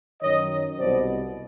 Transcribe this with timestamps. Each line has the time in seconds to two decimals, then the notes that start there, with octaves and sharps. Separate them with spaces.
0.21 F#2 D#3 C#5 D#5
0.78 C2 B2 C5 D5